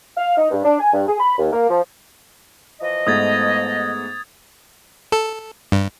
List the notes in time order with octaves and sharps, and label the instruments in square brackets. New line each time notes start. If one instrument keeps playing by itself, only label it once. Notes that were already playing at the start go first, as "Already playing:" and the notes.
[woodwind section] F5
D#4
G2
D4
G#5
G2
G#4
B5
D#2
A#3
F3
E3 F3 D#5
[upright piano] G#2 A3 B3 [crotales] D#6 G#6 A6
[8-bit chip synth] A4
G2